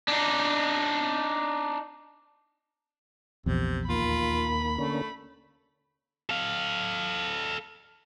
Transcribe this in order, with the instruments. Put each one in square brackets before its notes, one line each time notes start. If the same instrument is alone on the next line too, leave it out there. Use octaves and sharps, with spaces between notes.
[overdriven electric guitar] D4 D#4
[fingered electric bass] A#1 E2 [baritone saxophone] C3
[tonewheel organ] D#2 A#3 [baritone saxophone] F4 [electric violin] B5
[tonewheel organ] D3 A#3 C#4 [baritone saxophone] A3
[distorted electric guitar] A4 F5